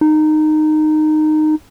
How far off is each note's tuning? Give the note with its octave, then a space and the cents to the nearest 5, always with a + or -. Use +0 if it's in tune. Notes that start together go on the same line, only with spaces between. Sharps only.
D#4 -15